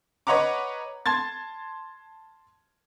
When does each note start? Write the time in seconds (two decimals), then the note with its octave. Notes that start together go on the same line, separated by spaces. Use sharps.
0.27 B4 C#5 D#5 F#5 A#5 D6
1.06 A5 C6 G#6 A6